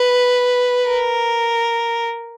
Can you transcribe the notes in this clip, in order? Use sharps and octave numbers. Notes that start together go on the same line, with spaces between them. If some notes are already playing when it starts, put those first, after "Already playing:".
Already playing: B4
A#4